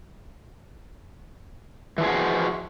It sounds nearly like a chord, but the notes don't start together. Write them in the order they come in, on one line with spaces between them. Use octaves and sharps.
E3 F3 G#4 F#4